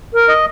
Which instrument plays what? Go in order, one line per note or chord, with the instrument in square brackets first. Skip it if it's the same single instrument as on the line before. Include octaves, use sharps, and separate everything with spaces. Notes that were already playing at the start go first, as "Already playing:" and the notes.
[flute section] A#4
[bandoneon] D#5